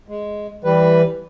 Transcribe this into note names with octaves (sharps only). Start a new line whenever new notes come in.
G#3
E3 G3 B4